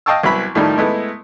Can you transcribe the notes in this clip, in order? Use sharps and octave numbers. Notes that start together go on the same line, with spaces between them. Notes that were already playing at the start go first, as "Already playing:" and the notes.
D#5 F5 G5 A5 C#6 E6
C2 F#3 B3 E5 B5
A2 D#3 F3 G3 A3
G#3 A3 B3 E4